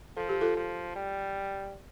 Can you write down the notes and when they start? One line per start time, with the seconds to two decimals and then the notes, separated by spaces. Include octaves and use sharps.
0.16 F3 A4
0.29 G4
0.41 F4 A4
0.57 F3
0.96 G3